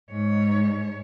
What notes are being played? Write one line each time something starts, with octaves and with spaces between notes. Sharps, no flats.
G#2 C#5